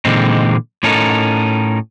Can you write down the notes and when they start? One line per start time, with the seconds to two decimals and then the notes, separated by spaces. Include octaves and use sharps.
0.05 A#2 D3 E3 G#3 C4 D#4
0.83 A2 C#4 D#4 A4 A#4